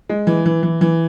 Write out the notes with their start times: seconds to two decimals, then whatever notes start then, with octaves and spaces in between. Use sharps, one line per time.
0.09 G#3
0.27 E3
0.46 E3
0.63 E3
0.81 E3